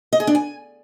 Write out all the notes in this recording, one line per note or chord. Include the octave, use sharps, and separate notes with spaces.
D#5
G#4
D4
G#5